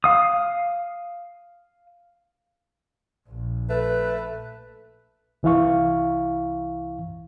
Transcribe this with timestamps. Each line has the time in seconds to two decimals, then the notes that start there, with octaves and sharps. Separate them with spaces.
0.04 F5 D#6
3.29 A#1
3.69 A3 B4
5.43 C2 E3 E4 F5 C#6